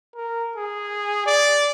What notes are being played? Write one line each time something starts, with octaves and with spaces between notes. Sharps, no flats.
A#4
G#4
D5